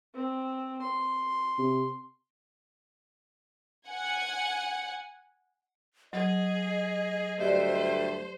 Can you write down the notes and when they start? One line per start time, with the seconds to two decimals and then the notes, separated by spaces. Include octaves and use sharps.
0.15 C4
0.82 C6
1.58 C3
3.87 F#5 G#5
6.13 F#3 G#4 D#5
7.40 D2 G2 A3 G4 C5 D5